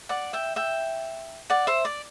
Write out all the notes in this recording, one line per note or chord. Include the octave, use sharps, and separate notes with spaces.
D5 F#5
E5 G5
E5 G5
D5 F#5
C5 E5
D5